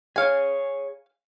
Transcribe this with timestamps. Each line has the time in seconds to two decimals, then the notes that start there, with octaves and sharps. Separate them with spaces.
0.16 G#4 C#5 F5 G#5